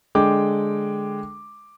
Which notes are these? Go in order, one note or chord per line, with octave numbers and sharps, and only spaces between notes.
D3 G#3 G5 D6